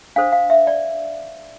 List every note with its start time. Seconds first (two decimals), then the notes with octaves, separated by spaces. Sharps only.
0.16 D4 A4 C5 F5
0.32 F5
0.50 E5
0.67 D5